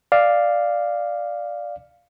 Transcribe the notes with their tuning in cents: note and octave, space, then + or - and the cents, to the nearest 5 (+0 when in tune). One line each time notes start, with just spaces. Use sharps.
D5 +5 F5 +0